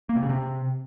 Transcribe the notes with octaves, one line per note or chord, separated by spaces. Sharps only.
A#3
C3
C#3
C3